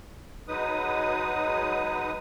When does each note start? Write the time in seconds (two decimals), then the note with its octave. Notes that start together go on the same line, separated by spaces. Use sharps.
0.48 F#3 G#3 D#4 B4 D#6